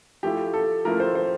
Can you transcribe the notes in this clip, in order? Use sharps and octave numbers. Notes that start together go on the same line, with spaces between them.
F3 A3 E4 G4
A4
F3 A3 E4 A#4
C5
C5